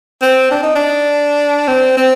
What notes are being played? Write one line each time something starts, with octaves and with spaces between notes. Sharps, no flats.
C4
D4
D#4
D4
C4
C4